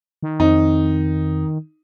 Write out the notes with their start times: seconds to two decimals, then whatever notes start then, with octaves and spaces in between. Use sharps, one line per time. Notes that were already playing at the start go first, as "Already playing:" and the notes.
0.23 D#3
0.40 F2 C4 D#4